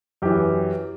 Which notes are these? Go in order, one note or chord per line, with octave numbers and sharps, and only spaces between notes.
F#2 E3 G4